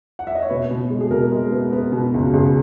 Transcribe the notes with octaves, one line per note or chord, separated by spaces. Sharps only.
F#5
E5
D#5
C#5
B2 B4
B2
G#3
G#4
B2 A#4
G#3
B3
B3
B2
C#2
C#2 G#4